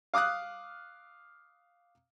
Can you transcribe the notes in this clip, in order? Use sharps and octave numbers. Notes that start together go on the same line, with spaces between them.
F5 D6 D#6 F6 F#6